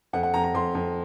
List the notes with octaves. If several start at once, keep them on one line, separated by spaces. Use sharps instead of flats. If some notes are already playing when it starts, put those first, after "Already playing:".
F2 F#5
F#5
F2 A#5
A#5
F2 C6
F2